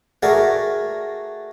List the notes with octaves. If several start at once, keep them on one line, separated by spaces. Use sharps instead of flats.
A3 F#4 G#4 A#4 D5